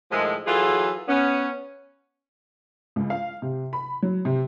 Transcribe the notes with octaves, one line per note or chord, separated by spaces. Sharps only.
A2 D#3 F3 G#3
E3 F#3 F4 G#4 A4
B3 C#4
C#2
F5
C3
B5
F#3
C3